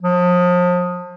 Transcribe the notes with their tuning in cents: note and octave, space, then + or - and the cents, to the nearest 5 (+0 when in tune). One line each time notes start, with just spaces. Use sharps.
F3 +35